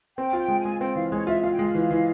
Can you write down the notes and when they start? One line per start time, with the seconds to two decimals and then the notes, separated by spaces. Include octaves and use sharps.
0.17 C4 G5
0.33 F4 G5
0.48 G#3
0.60 G#5
0.65 G#3
0.80 C4 G5
0.95 E3 F5
1.12 G#3 C#5
1.27 F4 E5
1.43 F4 F5
1.53 G5
1.59 G#3 F5
1.75 E3
1.91 E3